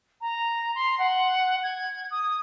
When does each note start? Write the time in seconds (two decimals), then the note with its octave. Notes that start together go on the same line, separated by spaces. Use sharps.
0.21 A#5
0.75 C6
0.99 F#5
1.63 G#6
2.11 D#6